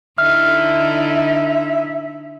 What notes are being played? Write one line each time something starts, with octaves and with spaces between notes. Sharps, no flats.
D3 D#4 E4 E5 F6